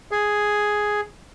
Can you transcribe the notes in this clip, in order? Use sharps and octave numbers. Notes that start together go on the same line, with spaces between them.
G#4